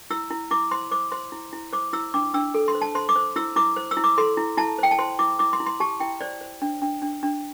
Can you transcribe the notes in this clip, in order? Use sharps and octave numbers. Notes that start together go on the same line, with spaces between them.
E4 E6
E4
E4 D6
C5 C6
C5 D6
C5 C6
E4
E4
C5 D6
E4 E6
D4 D6
D4 E6
A4
C6
C5
A5
C5 C6
D6
C5
E4 E6
E4 D6
C5
E6
E4
D6
A4 C6
E4
E4 A5
C5 G5
A5
C5 C6
E4 D6
E4 D6
C6
E4
C6
G4 A5
E4 G5
C5 D5
C5
D4
D4
D4
D4